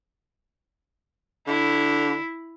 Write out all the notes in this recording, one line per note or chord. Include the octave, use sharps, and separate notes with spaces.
D3 E4